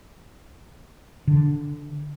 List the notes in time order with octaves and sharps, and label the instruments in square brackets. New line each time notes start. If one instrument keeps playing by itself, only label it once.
[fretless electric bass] D3